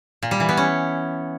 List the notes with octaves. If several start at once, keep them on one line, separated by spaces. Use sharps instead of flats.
A#2
G3
E3
B3
C#4